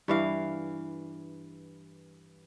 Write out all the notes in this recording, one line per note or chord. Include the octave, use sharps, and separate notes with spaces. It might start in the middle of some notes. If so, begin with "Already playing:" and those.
G2 E3 F5